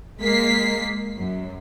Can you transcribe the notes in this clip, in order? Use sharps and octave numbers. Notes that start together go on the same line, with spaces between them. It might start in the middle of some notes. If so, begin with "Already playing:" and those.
G#3 A#3 B6 C7
F#2